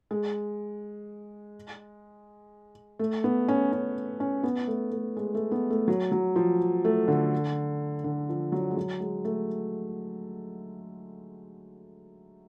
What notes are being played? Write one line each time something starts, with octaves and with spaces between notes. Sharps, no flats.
G#3
A3
B3
C#4
C#4
C#4
B3
A3
A3
G#3
A3
B3
A3
F#3
F#3
F3
A3
D3
D3
F3
F#3
G#3
F#3
G#3
A3